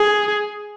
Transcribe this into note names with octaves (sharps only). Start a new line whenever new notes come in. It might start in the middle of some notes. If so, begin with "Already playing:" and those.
Already playing: G#4